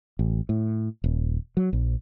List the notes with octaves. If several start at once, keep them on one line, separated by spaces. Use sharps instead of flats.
A1
A2
D#1
F#3
A#1